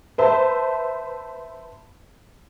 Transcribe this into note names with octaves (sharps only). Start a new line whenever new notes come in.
B4 C5 E5 A5